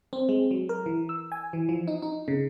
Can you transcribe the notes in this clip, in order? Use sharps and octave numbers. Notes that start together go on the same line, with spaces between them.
C4
G#3
F#3
A#4
E3
E6
G#5
E3
F3
D#4
D#4
C#3